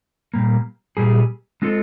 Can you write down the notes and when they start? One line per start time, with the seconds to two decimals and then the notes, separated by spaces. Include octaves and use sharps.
0.34 A#2 G3 A#3
0.97 A#2 G3 G#4
1.62 G#3 C4 F4 A4